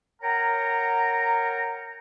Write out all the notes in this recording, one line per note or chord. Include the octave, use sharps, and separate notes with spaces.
A#4 C#5 F#5 G5 A#5